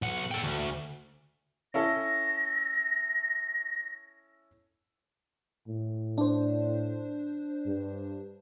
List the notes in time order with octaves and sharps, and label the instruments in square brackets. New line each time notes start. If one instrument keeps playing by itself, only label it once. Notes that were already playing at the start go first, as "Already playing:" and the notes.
[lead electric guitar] B1 F#5
A4 G5
D2
[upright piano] C#4 E4 A4 [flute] A#6
[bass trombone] A2
[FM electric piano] D4 C5
[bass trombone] G2